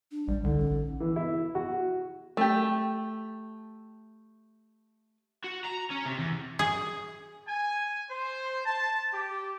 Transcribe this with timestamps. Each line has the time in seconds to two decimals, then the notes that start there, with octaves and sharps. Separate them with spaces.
0.11 D4
0.28 A#1 G3
0.44 C#2 D3 D#4
0.59 A#1 C#4
1.00 E3
1.16 E4
1.55 F#4
2.37 A3 G4
5.44 F#4
5.64 A#5
5.90 C#4
6.06 C3
6.19 E2
6.59 G#4
7.48 G#5
8.10 C5
8.66 A5
9.13 G4